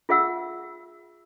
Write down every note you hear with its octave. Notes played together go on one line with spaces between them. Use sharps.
F4 G#4 E5 F#5 E6